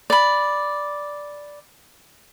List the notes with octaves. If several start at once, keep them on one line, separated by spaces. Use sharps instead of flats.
D5 B5